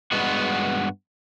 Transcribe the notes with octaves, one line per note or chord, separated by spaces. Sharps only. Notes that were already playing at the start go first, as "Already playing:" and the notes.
G2 G#3 B3 F#4